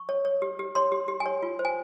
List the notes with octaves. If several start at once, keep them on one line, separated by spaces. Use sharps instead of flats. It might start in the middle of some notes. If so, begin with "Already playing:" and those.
Already playing: C#6
C#5
C#5
G4
G4
C#5 C6
G4
G4
G#5
C#5
F4
C5
G#5